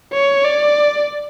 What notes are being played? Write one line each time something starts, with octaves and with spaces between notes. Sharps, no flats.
C#5
D5